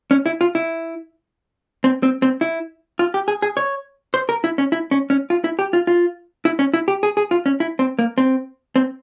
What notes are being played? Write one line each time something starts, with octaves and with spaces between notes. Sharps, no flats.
C#4
E4
F4
E4
C4
C4
C4
E4
F4
G4
G#4
G#4
C#5
C5
A#4
E4
C#4
E4
C#4
C#4
F4
E4
G4
F4
F4
E4
C#4
E4
G4
G#4
G#4
F4
C#4
E4
C4
A#3
C4
C4